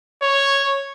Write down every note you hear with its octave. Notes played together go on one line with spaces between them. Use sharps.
C#5